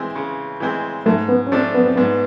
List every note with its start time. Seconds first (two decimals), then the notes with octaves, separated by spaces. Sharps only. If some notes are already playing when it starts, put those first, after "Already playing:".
Already playing: E3 G#3 C4
0.15 C#3
0.60 E3 G#3 C4
1.06 G#2 A3
1.28 B3
1.47 C#4
1.52 F3 A3 C4 D4
1.74 B3
1.85 C4
1.96 G#2 B3